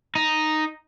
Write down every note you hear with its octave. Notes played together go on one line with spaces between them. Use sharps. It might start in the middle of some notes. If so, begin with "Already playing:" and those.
D#4